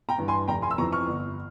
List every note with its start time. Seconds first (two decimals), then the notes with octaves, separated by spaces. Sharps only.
0.09 G5 A#5
0.18 G2 E3
0.28 G#5 C6
0.48 F1 G5 A#5
0.62 G#5 C6
0.71 E6
0.78 F2 E3 A#5 C#6
0.92 C#6 F6
1.07 G1